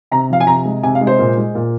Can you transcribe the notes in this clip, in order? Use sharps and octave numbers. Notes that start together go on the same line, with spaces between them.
C3 A#5
F3 F5
G#5
C3 A#5
G#3
C3 G#5
F5
G#3
C5
A#2
G#3
A#2